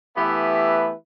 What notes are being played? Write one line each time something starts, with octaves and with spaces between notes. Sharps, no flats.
E3 A3 B3 G4 B4 E5